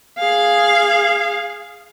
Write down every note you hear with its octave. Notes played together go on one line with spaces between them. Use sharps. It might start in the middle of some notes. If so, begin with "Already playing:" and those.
G#4 F5